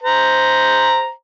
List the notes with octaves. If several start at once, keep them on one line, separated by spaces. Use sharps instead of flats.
C5 A#5